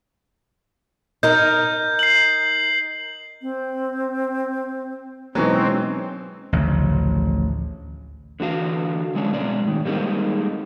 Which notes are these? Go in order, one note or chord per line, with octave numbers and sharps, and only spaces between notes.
D#4 A#4 G6
C7 F#7
C4
B2 E3 F#3 G#3 C4 C#4 D#4
A1 D2 C#3 F3
D3 E3 F#4 F5
D3 F#3 G#3 C#4 D4
B2 F#3 G#3 D5
A2 D#3
G3 G#3 A#3 C4 D#4